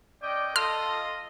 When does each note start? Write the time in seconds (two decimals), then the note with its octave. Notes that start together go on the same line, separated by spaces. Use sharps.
0.22 C#4 D5 D#5 G5
0.56 F4 A4 D#5 C6 F6